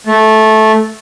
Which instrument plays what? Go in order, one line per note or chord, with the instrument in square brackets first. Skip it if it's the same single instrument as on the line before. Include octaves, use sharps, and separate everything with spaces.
[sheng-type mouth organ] A3